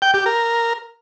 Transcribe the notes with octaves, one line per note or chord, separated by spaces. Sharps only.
G5
G4
A#4